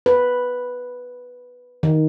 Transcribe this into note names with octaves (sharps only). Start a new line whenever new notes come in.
B4
D#3